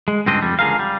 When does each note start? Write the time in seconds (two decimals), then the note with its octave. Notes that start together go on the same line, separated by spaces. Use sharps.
0.08 G#3
0.26 C#2 G2 C4 D4 D#5
0.42 F2 G3
0.59 C#2 D3 G#4 A#4 F5
0.79 G3